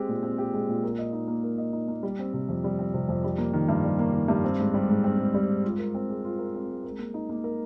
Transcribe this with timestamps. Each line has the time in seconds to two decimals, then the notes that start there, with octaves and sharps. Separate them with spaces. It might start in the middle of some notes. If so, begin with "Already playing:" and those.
Already playing: G#3 C4 G4
0.08 A#2
0.23 C4
0.38 G4
0.54 G#3
0.68 A#2
0.83 A#4
0.99 D#5
1.13 D#4
1.28 A#3
1.44 A#4
1.58 D#5
1.73 D#4
1.88 A#3
2.03 G3
2.19 C4
2.34 C3
2.49 F2
2.64 G3
2.79 C4
2.94 C3
3.09 F2
3.24 G3
3.38 A#3
3.53 D#3
3.69 G2
3.84 G3
3.99 A#3
4.14 D#3
4.28 G2
4.44 C4
4.59 G#2
4.74 G3
4.89 G#2
5.04 C4
5.19 G#2
5.34 G3
5.49 G#2
5.64 F4
5.79 A#4
5.95 C4
6.10 G#3
6.24 F4
6.39 A#4
6.55 C4
6.69 G#3
6.84 A#4
6.99 A#3
7.14 D#4
7.29 A#3
7.44 A#4